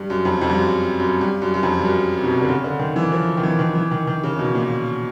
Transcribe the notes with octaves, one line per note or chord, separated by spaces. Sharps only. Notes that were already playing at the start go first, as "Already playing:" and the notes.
Already playing: G2
F#2
F2
F2
G2
F#2
F#2
G2
F#2
F#2
F2
G2
F#2
C3
B2
C3
D3
C#3
D3
D#3
E3
F3
D#3
E3
D#3
E3
D#3
D#3
C#3
B2
A#2